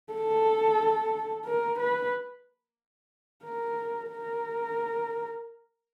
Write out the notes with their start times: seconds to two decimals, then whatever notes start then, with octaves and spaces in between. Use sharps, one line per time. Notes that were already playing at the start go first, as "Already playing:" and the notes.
0.13 A4
1.46 A#4
1.79 B4
3.44 A#4
4.10 A#4